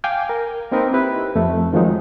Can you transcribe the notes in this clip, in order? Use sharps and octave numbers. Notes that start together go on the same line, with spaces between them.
F5 G5 G#5 D6 G6
A#4
A#3 C4 D#4 A#4 B4
E4 G4 B4
F2 A3
D#3 F3 F#3 G#3 D#4